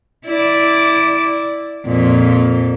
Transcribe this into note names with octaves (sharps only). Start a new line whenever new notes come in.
E4 D5
F2 A#2